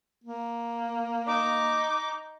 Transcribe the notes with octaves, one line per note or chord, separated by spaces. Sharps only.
A#3
D#4 D6